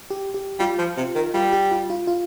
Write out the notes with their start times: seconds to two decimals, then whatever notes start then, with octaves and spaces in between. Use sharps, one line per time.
0.10 G4
0.34 G4
0.59 G3 F4
0.79 F3
0.97 C3
1.15 D#3
1.34 G3 F4
1.53 G4
1.71 F4
1.90 F4
2.07 F4